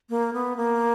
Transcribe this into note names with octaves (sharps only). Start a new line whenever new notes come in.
A#3
B3
A#3